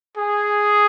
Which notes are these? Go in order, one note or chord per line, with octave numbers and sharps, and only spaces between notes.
G#4